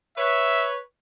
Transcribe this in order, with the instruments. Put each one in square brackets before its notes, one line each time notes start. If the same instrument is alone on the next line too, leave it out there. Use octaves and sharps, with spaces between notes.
[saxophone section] B4 C#5 [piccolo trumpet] E5